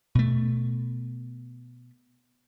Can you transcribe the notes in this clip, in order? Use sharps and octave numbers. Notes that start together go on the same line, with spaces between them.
B2 A3